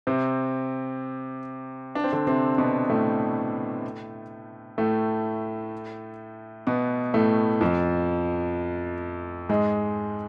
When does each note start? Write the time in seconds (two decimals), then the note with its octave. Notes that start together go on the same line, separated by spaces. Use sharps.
0.07 C3 C4
1.95 D4
2.04 C4
2.13 D3 D4
2.27 C3 C4
2.58 B2 B3
2.90 A2 A3
4.78 A2 A3
6.67 B2 B3
7.14 A2 A3
7.61 F2 F3
9.49 G#2 G#3